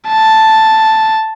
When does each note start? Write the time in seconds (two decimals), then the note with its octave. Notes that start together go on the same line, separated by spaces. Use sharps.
0.08 A5